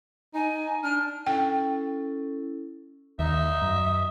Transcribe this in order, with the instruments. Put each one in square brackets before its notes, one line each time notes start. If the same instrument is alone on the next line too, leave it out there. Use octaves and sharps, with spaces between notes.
[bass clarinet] D#4 [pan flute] G#5
[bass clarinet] D4 [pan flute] F6
[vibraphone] C#4 E4 A4 [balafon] G5
[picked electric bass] D#2 [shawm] D#4 [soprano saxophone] E5
[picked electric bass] F#2 [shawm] D#5